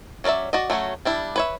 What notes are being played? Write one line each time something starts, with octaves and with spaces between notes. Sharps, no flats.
F#3 C#4 A#4 D5 E5
F#4 D5 D#5
F#3 A3 C#4 F#4
G3 D4 E4
B4 C#5 E5